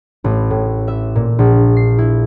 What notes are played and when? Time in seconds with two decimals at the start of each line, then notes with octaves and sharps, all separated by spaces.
0.24 A1
0.50 A2
0.88 E5
1.15 A#2
1.39 A#1
1.76 C7
1.98 E4